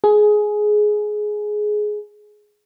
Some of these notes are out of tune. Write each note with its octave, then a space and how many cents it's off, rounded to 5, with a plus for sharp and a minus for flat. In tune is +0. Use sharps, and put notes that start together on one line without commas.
G#4 +15